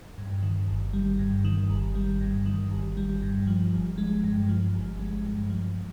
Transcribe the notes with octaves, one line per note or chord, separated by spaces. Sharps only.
G2
D#3
G1
G3
G2
D#3
G1
G3
G2
D#3
G1
G3
G2
F3
G1
G#3
G2
F3
G1
G#3
G2
F3